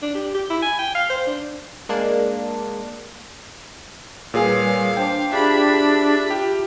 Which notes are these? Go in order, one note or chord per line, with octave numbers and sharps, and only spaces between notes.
D4
G4
G4
E4
G#5
G5
F5
C5
D4
G#3 A#3 D4
A#2 G3 G#4 B4 C#5 F5 G#5
D4 C5 G5 A5 D6
D4 F4 G4 G#4 E5 B5
F4 G4